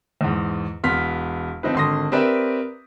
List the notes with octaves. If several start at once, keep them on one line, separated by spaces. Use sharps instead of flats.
E2 G#2
E1 B3 C6 F6 B6
F3 C4 D#4 B4
G#1 D3 C6 D#6 A#6
C4 G4 A#4 B4 D5 E5